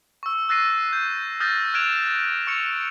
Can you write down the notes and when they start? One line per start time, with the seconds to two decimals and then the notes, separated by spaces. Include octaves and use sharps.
0.23 C#6 E6
0.49 E6 F#6 A6 A#6 C7 D#7
0.93 G6
1.40 D#6 F6 G6 A6 A#6
1.74 F6 F#6 G#6 D7 E7 F7
2.47 C#6 E6 C#7 F7